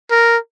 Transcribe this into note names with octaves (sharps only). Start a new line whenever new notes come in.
A#4